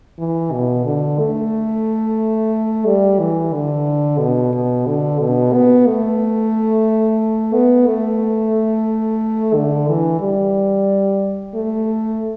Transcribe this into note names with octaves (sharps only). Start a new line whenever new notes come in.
E3
B2
D3
A3
G3
E3
D3
B2
B2
D3
B2
B3
A3
B3
A3
D3
E3
G3
A3